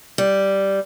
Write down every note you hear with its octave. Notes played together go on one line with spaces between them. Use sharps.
G3